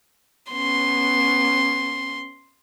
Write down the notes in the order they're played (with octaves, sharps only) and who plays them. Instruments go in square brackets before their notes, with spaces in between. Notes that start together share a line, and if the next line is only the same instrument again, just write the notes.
[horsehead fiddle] B3 C#4 [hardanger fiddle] C6